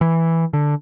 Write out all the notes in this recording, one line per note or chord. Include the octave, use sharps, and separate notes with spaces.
E3
D3